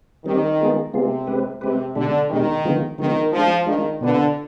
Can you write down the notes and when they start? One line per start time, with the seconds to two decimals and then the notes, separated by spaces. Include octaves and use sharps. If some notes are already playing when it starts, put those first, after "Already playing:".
0.25 D#3 G3 C4 G4
0.60 G#3 B3 F4 G#4
0.94 C3 G#3 B3 F4 G#4
1.27 G#3 C4 G4 B4
1.61 C3 G#3 C4 G4 B4
1.95 B2 D3 G#3 D4 G4
2.30 B2 D#3 G#3 D4 G4
2.65 D3 F3 G#3 B3 F4
2.98 D3 D#3 F3 G#3 B3 F4
3.33 F3 G#3 D4 F4
3.66 D#3 G#3 D4 F4
4.01 B2 D3 B3 F4 B4